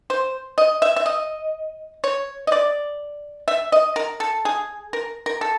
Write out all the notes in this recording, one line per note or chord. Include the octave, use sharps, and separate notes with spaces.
C5
D#5
E5
E5
D#5
C#5
D#5
D5
E5
D#5
A#4
A4
G#4
A#4
A#4
A4